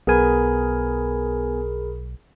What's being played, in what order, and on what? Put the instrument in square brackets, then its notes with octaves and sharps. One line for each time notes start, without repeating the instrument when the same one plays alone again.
[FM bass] B1 [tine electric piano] B3 G#5 [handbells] G#4 A#4 B5